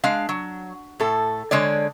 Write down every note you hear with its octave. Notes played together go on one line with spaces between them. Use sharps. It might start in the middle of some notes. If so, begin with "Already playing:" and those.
G#3 D4 F5
F#3
A2 A4
D3 G#3 C#5 D5